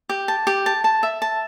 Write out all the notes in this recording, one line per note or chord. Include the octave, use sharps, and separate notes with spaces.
G4
A5
G4
A5
A5
E5
A5